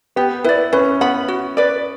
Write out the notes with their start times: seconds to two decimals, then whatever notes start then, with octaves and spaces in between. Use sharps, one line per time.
0.16 B3 G4
0.44 E4 B4 D5
0.73 C#4 B4
1.01 B3 F#5 B5
1.28 F#4
1.57 B4 D5